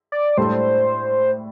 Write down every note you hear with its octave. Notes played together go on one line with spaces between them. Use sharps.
D5
A2 G3 D4 A4 C5